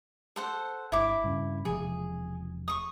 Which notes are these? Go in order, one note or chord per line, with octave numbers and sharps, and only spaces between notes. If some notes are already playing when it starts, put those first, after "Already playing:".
A4 C5 F#5
G1 E4 D6
G2 C#3
E1 C3 F3 G#4
C#6 D#6